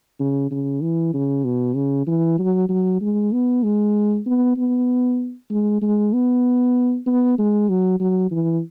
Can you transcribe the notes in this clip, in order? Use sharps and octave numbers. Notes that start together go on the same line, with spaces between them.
C#3
C#3
E3
C#3
B2
C#3
E3
F#3
F#3
G#3
B3
G#3
B3
B3
G#3
G#3
B3
B3
G#3
F#3
F#3
E3